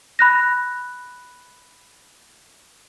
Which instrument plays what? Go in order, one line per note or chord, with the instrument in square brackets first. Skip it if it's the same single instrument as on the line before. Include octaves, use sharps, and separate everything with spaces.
[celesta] B5 F#6 A#6